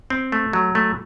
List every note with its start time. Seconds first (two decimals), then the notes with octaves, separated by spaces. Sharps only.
0.10 C4
0.32 A3
0.53 F#3
0.75 A3